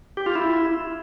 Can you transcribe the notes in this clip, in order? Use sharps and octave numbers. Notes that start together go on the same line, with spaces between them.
G4
F4
E4